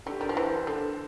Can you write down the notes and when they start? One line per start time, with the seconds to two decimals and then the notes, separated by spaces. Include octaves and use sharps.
0.06 D3 G4
0.21 G3 A#4
0.29 F3
0.37 E3 C5
0.67 D3 A4